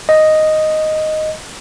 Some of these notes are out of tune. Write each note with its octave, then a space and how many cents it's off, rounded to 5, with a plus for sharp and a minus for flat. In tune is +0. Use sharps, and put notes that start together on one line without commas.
D#5 +0